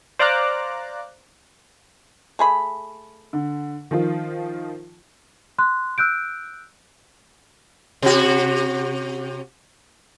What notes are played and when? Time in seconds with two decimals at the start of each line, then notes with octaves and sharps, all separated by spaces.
0.19 C5 D5 F5 A#5 D6 F#6
2.39 A3 G#4 B5
3.33 D3
3.91 D#3 F3 F4
5.59 C6 F#6
5.98 E6 F#6 G6 D7
8.02 C3 F#4